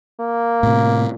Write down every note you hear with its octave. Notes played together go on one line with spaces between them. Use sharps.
A#3
A2 C3